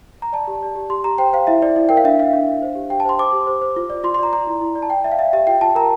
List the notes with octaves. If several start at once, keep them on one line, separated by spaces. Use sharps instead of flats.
A#5
D5 A5
G4
D5
G4
G4 C6
G4 A#5
C5 G5
C5 F5
E4 E5
E4 D5
E4
A#4 G5
F5
D4 E5
D4 F5
D4
D4
C5
G4
G4 G5
A5
C5 C6
C5 D6
G4
C5
C5
F4
D5
F4 C6
C6
D5 A#5
D5 A#5
E4
E4
D5
A5
D5 G5
D5 E5
F5
D5 E5
G4 E5
F4 G5
F4 A5
A#4 A#5